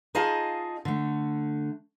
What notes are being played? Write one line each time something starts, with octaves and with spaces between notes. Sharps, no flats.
D#4 F4 G#4 D#5 F5 A5
D3 A3